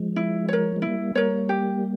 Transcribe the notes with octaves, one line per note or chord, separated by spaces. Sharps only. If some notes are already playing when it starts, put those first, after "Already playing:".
Already playing: F3 G#3
E4
A#4 C#5
G#3
G3 A#3 E4
G3 A#3 A#4 C#5
G4